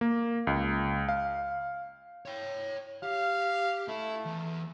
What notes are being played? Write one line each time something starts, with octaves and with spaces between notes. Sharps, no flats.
A#3
C#2
F5
C#5 G5
G4 F5
A3 E4
E2